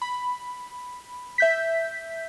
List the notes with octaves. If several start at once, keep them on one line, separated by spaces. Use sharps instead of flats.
B5
E5 G6 B6